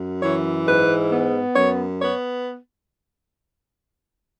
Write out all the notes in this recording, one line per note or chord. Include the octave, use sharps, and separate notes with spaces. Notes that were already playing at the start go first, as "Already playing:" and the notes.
Already playing: F#2
E3 C#5
G#2 B4
B3
F#2 C#5
B3 C#5